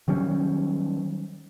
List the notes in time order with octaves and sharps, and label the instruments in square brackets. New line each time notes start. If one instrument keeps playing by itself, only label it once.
[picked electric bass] D#3 F#3 G3 C#4